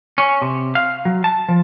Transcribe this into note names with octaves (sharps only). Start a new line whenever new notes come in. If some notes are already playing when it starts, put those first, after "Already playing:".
C#4
C3
F5
F#3
A5
F3